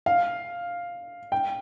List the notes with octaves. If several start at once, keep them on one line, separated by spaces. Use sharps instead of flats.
F5
G5